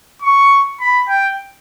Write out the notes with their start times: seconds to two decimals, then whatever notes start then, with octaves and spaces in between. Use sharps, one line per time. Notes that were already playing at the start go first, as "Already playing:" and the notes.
0.22 C#6
0.80 B5
1.09 G5